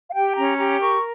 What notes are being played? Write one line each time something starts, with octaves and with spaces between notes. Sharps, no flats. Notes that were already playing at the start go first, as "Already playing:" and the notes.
F5
G4 G5
C#4 A#5
G4 A#5
A#4 C#6